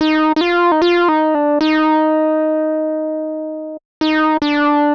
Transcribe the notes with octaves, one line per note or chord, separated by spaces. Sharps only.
D#4
D#4
F4
D#4
F4
D#4
D4
D#4
D#4
D4